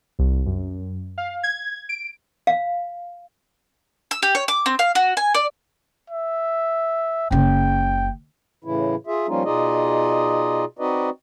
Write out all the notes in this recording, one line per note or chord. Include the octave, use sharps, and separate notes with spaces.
C2
F#2
F5
G#6
D7
F5
E6
G4
C#5
D6
C4
F5
F#4
G#5
D5
E5
F#1 C#3 G5
A2 C#3 E3 E4
F4 G#4 E5
F3 G3 A#3 C#4 D#4 F4
B2 D#4 F4 G#4 D5 D#5
C4 D#4 F#4 B4 D5 D#5